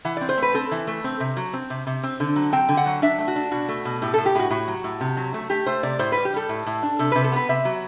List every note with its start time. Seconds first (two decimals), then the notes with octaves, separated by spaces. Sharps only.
0.05 E3 F#5
0.17 C4 D5
0.29 C5
0.37 A3 B4
0.54 C4 A4
0.71 E3
0.87 A3
1.04 C4
1.20 C3
1.37 F#3
1.53 C4
1.70 C3
1.87 C3
2.03 C4
2.20 D3
2.36 F#3
2.53 C4 G5
2.69 D3
2.77 F#5
2.86 F#3
3.02 D4 E5
3.18 A3
3.28 F#4
3.36 D4
3.51 B2 F#4
3.69 A3
3.85 B2
4.02 A2 G4
4.14 A2 A4
4.26 G4
4.35 A2 F#4
4.50 A2 F#4
4.68 F#3
4.84 A2
5.01 C3
5.17 F#3
5.34 A3
5.50 A3 G4
5.66 A3 C5
5.83 C3 D5
5.99 A2 C5
6.12 G3 B4
6.25 G4
6.33 G3 A4
6.49 A2
6.66 A2
6.83 D4
6.99 C3 A4
7.12 C3 B4
7.24 A4
7.32 B3 B4
7.49 C3 E5
7.65 F#3